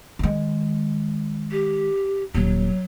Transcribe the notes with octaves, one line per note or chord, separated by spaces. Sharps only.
D#3 G#3
G4
D#1 F#3